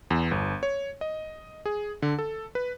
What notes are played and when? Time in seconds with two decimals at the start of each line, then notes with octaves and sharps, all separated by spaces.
0.10 E2
0.31 G1
0.63 C#5
1.01 D#5
1.66 G#4
2.02 D3
2.19 A4
2.55 B4